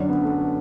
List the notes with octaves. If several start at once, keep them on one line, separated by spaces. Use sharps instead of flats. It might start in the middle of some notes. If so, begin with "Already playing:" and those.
Already playing: F#2 D3 F#3 C#4 D4
B3
A3